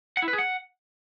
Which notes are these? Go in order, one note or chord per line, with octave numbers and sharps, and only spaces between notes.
F#5
E4
B4
G#4
F#5